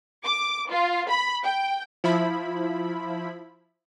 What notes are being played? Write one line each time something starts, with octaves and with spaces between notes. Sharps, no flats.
D6
F4
B5
G5
F3 E4 B5